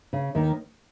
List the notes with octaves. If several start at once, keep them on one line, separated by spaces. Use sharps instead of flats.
C#3
D#2 D#3